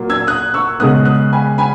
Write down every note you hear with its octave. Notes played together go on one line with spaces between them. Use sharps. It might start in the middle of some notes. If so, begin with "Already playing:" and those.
Already playing: A#2 F#3 A#3
E6 G#6
D#6 F#6
C#6 E6
C#3 G#3 B3 D#6 F#6
D#6 F#6
G#5 B5
G#5 B5